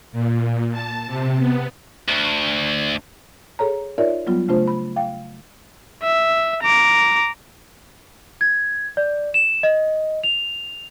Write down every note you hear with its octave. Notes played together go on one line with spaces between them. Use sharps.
A#2
A5
C3
B3
D2
G#4 A4 C#5 A#5
D#4 F4 A#4 C#5 D5 E5
F#3 G3 B3 F4
C#3 A3 D4 F4 C5
B5
F5 G5
E5
A#5 D6
G#6
D5
E7
D#5
F7